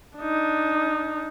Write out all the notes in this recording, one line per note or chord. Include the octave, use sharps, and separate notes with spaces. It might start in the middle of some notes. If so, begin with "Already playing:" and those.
D4 D#4